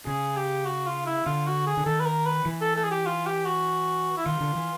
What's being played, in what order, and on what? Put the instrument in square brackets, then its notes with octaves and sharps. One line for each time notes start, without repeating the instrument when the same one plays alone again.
[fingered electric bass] C#3 [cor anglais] G#4
[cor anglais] G4
F#4
F4
E4
[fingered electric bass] D3 [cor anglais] F4
[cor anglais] F#4
G#4
[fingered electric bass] D3
[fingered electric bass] D#3 [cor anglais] A4
[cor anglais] B4
A#4
B4
[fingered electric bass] E3
[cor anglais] A4
A4
G#4
G4
F4
G4
F#4
E4
[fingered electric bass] D#3 [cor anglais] F4
[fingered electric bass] D3
E3